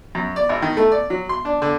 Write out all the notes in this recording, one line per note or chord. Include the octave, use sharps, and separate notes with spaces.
F#2
D5
G#1
D#3
A3
D5
F#3
C6
D4
D3